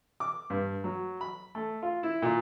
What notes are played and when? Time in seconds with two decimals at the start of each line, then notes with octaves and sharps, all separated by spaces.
0.20 D6
0.50 G2
0.84 F#3
1.21 B5
1.55 A3
1.82 F4
2.03 E4
2.22 A#2